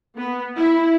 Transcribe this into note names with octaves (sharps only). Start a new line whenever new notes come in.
B3
E4